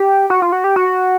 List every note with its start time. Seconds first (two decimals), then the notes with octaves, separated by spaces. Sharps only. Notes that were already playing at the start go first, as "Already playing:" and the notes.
Already playing: G4
0.30 F#4
0.42 F4
0.52 F#4
0.64 G4
0.76 F#4